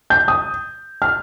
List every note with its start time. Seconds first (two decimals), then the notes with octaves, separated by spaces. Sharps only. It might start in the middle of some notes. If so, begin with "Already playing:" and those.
0.10 G6
0.28 D#6
1.02 F6